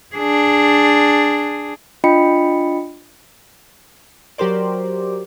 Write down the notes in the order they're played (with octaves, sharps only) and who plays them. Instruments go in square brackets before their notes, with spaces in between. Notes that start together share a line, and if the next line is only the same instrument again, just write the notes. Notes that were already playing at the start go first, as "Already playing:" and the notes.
[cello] D4 G#4
[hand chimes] D4 F4 D#5 G5 B5 C#7
[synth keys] F#3 G4 A#4 C5 D5